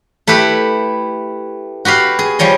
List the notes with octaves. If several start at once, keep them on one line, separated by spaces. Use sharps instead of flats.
A3 E4 G4 B4
F#4 G4 B4 F5
G#4
F3 G3 C#5 D#5